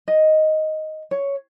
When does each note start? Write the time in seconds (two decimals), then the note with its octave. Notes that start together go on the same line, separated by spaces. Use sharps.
0.08 D#5
1.11 C#5